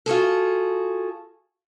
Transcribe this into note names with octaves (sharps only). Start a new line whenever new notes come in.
F4 F#4 G#4 A4